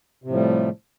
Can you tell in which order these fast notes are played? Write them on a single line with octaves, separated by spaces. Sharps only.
C3 A2 F3 G3 A3